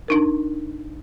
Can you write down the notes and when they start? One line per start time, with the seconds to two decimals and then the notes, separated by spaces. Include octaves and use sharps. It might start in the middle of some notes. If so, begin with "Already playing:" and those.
0.08 D4 D#4 A#4